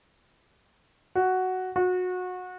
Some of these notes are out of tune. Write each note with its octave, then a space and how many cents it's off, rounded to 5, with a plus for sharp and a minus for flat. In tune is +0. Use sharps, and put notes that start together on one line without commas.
F#4 +5
F#4 -25